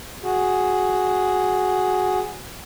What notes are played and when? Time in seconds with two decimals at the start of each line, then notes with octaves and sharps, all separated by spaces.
0.24 F#4 G#4